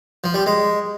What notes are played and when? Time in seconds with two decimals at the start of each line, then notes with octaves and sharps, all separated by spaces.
0.24 F3
0.34 G3
0.46 G#3